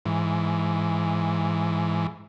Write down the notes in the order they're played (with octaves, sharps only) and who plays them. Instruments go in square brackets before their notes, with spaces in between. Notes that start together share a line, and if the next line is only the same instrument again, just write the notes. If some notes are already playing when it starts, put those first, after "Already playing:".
[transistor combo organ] G#2 E3